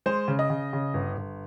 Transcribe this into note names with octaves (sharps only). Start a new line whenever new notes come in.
G#3 C5
C#3
D#5
C#3
C#3
G1
G1